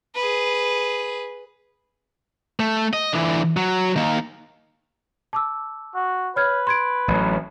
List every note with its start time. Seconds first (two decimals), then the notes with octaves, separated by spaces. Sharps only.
0.15 G#4 B4
2.60 A3
2.93 D#5
3.13 D3 E3
3.57 F#3
3.96 D#3 A#3
5.33 A5 D6 E6
5.95 F#4
6.36 B4 C#5 F6 G#6
6.67 C6 G#6 D7
7.08 A1 F#3